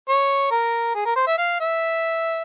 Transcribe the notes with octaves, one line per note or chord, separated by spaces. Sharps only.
C#5
A#4
G#4
A#4
C5
E5
F5
E5